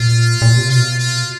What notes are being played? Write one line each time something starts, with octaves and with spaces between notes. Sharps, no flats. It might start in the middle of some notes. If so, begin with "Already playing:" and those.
Already playing: A#2 F4
A#2
C3
B2 F4
F4